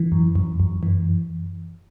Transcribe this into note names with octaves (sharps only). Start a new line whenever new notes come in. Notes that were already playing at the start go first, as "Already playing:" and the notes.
Already playing: E3
F#2
F#2
F#2
E3